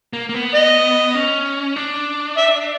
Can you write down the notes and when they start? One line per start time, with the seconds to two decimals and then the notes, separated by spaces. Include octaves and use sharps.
0.13 A#3
0.29 A#3
0.34 B3
0.54 D#5
1.15 C#4
1.76 D4
2.37 E5